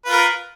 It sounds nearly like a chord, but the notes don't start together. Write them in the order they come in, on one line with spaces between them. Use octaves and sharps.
B4 F4 A#4